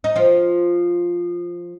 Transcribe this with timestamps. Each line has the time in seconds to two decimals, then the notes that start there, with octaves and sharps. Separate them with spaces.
0.04 D#4
0.16 F3 F4